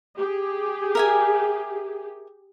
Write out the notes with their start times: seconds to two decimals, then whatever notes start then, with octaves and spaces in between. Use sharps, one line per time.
0.18 G4 G#4
0.95 A#4 E5 G#5